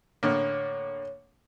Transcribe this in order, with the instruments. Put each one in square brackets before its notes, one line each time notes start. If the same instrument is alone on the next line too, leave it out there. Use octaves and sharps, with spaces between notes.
[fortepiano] A2 D3 A#3 [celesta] C#5